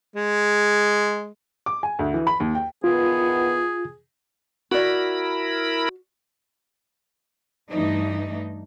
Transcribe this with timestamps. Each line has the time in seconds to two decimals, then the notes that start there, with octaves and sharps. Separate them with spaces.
0.16 G#3
1.66 D6
1.83 G#5
1.99 D2
2.14 E3
2.27 B5
2.40 D#2
2.55 G5
2.84 D#3 E3 B3 F4 G#4
4.71 E4 F#4 A#4 D5 B5
7.69 G2 E3 A3 D4 D#4